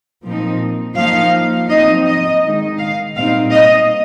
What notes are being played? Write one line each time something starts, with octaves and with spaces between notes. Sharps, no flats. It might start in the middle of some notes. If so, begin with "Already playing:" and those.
A#2 F3 C4 D#4
F3 A#3 D#4 F5
F3 C4 D#4 D#5
D#5
D#3 G#3 D#4
F5
A#2 G3 C4 D#4 F5
D#5